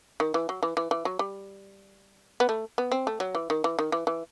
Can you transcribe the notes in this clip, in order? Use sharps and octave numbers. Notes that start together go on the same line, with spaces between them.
D#3
E3
F#3
E3
E3
E3
F#3
G3
B3
A3
B3
C4
A3
F#3
E3
D#3
E3
D#3
E3
E3